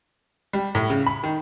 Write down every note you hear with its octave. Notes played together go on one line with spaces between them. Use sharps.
G3
A2
C#3
B5
D#3